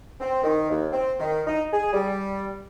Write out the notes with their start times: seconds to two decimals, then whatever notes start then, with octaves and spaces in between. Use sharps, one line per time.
0.21 C4
0.43 D#3
0.70 D#2
0.93 C4
1.20 D#3
1.46 D#4
1.73 G#4
1.93 G3